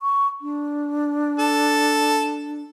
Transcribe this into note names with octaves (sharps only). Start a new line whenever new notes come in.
C#6
D4
A4